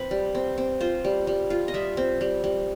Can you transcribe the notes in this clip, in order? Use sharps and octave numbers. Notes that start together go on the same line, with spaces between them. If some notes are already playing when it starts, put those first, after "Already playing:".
Already playing: C4 B4
G3
C4
C4
F4 C5
G3
G3
F4
D#5
G3 E5
C4
G3
G3